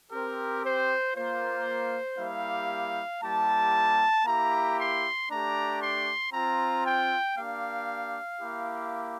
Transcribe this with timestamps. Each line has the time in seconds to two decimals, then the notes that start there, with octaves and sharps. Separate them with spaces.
0.11 C4 G4 A#4
0.63 C5
1.15 A#3 F4 C5
2.18 G3 A#3 E4 G4 F5
3.22 G3 A#3 E4 G4 A5
4.26 A#3 E4 G4 A#5
4.77 C6
5.29 A3 D4 G4 A#5
5.81 C6
6.32 C4 F4 A#5
6.85 G5
7.36 A#3 D4 G4 F5
8.40 A#3 E4 G4